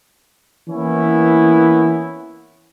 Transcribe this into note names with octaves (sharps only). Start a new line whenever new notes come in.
E3 A#3 B3 C#4 E4